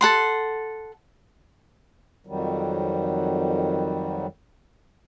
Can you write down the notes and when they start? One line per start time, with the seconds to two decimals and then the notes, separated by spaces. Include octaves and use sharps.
0.01 A4 F#5 C6
2.27 F2 D#3 F#3 G3